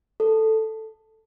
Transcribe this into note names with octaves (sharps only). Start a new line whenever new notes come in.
A4